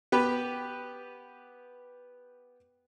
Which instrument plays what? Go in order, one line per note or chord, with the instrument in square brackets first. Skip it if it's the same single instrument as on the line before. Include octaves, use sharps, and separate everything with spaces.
[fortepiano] B3 G4 B4